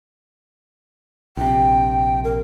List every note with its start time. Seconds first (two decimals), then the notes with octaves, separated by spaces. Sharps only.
1.37 A#1 C3 G5
2.24 A#4